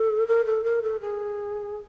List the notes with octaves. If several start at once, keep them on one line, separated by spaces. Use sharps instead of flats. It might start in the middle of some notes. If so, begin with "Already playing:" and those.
Already playing: A4
A#4
A4
A#4
A4
G#4